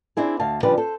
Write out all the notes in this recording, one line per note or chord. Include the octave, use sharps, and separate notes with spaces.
C4 D4 E4 G#4
D2 F5 A5
C#3 F3 G3 D4 B4 D5
A4 C5